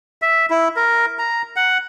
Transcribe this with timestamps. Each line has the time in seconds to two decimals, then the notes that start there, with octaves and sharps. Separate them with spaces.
0.22 E5
0.50 E4
0.76 A#4
1.19 A#5
1.56 F#5